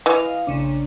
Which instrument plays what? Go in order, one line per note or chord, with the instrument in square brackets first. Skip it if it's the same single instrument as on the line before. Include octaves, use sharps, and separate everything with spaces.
[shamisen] E3 [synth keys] D#5 F5
[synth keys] A#1 C#3 D4